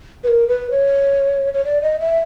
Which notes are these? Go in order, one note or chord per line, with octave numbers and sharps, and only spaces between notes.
B4
A#4
B4
C#5
C#5
D5
D#5
E5